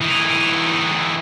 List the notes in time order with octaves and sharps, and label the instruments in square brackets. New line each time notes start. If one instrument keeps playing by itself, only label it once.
[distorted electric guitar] E3 D#4